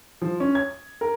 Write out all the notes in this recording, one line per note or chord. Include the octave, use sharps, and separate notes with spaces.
F3
C#4
G#6
A#4